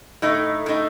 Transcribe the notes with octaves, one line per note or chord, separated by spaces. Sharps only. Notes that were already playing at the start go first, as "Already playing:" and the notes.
A2 A3 D#4
A2 A3 D#4